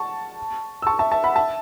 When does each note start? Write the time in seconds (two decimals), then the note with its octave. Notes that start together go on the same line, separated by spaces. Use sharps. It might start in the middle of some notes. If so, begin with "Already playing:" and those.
Already playing: F#5 A5 C#6
0.82 E6
0.87 A5 C#6
0.99 E5 A5
1.12 E5 A5
1.24 F#5 B5
1.36 E5 A5